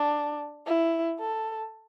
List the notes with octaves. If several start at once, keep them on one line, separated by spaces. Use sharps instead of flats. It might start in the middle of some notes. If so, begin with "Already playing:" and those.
Already playing: D4
E4
A4